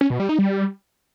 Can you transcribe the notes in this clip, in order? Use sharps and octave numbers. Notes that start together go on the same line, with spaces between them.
C#4
B2
G3
D#4
G3